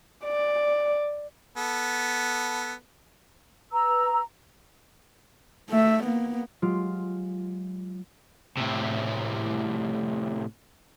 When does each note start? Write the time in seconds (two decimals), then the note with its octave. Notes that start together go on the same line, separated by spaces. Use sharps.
0.24 D5
1.57 B3 A4
3.72 B4 A#5 E6
5.70 A3 E5
6.04 A#3 B3
6.62 F#3 G#3 F4 G4
8.57 A2 C3